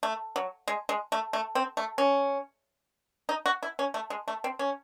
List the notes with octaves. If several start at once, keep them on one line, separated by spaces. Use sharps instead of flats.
A3
F#3
G#3
G#3
A3
A3
C4
A3
C#4
D#4
F#4
E4
C#4
A3
G#3
A3
C4
C#4